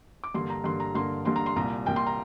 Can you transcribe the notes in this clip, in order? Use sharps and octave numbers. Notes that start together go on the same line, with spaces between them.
D6
G2 D3 A#3 C6
A#5
G2 D3 A#3 C6
A#5
G2 D3 A#3 C6
G2 D3 A#3 C6
A#5
C6
C2 A#2 A#3 A#5
C2 A#2 A#3 G5
C6
A#5